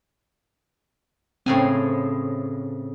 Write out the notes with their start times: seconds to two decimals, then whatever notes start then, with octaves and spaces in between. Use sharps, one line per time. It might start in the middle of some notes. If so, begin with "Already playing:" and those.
1.46 A2 C#3 C4 G#5